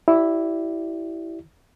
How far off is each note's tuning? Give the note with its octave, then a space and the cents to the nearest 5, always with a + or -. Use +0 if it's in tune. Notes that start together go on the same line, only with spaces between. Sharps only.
E4 +0 G4 -30 D5 +0